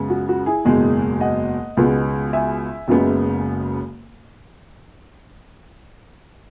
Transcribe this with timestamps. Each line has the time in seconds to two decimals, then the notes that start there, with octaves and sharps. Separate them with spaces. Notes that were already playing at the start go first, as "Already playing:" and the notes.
Already playing: F#2 C#3 G#3 B3
0.10 F#4
0.29 F#4
0.46 E4 G#4
0.65 F#1 E2 B2 G#3
1.21 D#5 F#5
1.77 C#2 B2 G#3 B3
2.33 E5 G#5
2.88 F#1 F#2 C#3 G#3 B3